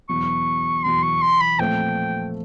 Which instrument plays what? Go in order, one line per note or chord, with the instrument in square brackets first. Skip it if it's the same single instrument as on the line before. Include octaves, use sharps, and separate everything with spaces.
[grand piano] E2 B2 F#3 [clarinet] C#6
[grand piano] E2 B2 F#3 [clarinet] C6
[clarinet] C#6
C6
B5
[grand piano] A#2 F3 A3 C4 [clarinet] G5